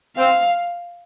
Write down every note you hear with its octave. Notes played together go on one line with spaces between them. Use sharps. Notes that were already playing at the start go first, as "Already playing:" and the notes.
C4 F5